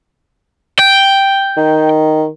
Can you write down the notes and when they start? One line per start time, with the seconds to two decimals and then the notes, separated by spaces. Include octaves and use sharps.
0.79 G5
1.57 D#3